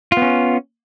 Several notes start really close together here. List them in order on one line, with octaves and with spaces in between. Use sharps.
F4 B3 C#4